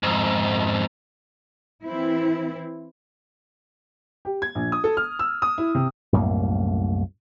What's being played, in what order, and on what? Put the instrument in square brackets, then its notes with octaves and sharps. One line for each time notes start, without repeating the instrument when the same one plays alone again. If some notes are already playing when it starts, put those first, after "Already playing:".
[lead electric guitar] F2 G#2
[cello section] E3 C4 E4
[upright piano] G4
G#6
A#1
D#6
A4
F6
E6
D#6
E4
C3
[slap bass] C2 F#2 A2 A#3